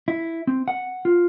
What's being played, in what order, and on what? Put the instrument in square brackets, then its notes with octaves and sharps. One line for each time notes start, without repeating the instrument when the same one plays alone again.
[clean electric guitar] E4
C4
F#5
F4